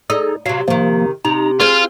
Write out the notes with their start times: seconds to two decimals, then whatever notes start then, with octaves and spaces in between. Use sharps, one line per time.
0.10 D#4 G#4 A4
0.46 C3 F#3 F5
0.68 C3 D#3 F3 A#3
1.25 C3 D#4 A#5
1.60 C4 F4 G#4 C5 F6